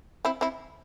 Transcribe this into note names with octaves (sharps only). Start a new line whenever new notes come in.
C4 E4
C4 E4